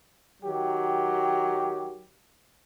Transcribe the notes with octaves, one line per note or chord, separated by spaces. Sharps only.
D#3 F#3 G4